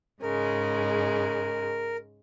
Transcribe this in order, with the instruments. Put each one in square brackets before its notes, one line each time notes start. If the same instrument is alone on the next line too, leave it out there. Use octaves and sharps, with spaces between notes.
[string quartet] G#2 C#3 G#3 [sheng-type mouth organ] A#4